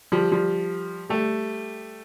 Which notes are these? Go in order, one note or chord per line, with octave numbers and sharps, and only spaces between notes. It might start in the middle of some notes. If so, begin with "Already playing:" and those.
F3 G3
F3 G3
G3 A3